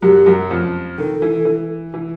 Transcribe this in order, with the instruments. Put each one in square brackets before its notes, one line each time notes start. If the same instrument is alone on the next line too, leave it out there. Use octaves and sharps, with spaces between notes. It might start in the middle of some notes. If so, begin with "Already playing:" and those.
[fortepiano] F#2 F#3 [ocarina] G4
[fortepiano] F#2 F#3
F2 F3
[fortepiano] D#3 [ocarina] A4
[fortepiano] E3
E3
E3